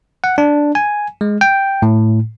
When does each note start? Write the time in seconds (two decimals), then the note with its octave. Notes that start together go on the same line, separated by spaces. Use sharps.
0.24 F#5
0.38 D4
0.75 G#5
1.21 G#3
1.41 G5
1.82 A2